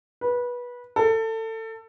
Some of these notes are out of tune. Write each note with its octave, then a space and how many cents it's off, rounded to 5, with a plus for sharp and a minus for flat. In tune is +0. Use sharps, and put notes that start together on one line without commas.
B4 -20
A4 +25